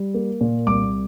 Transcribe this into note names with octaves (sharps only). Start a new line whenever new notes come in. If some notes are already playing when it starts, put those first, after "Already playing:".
Already playing: G3
A#3
A#2
C2 D6